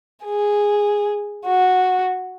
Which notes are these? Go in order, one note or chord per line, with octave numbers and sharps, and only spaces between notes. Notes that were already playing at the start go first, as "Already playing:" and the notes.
G#4
F#4